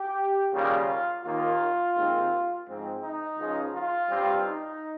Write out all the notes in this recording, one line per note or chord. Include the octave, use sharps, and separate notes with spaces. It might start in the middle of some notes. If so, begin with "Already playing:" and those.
Already playing: G4
D#2 C#3 G3 A#3 F4
D#2 D#3 A#3 F4
D#2 D#3 G#3 C4
G#2 F3 G#3 C4
D#4
C#2 C#3 F3 G#3
F4
G2 G3 C4
D#4